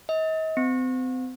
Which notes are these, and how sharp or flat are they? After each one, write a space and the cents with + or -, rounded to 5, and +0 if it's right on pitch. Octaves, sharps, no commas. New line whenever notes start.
D#5 +40
C4 -35